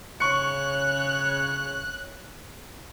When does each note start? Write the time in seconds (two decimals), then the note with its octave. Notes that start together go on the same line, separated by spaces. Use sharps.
0.20 C#3 C#5 C#6 F#6 C#7